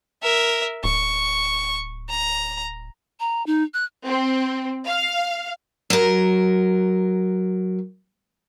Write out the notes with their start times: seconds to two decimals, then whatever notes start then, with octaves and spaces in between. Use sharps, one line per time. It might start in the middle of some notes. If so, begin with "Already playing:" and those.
0.22 A#4 E5
0.84 D1 C#6
2.09 A#5
3.20 A#5
3.47 D#4
3.74 F#6
4.07 C4
4.86 F5
5.90 F#3 A#4